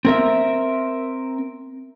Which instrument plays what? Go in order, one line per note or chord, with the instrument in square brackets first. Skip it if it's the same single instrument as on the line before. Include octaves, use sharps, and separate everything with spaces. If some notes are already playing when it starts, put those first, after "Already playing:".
[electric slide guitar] C4 A#4 E5